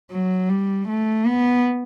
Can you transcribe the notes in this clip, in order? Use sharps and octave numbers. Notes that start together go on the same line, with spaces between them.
F#3
G3
A3
B3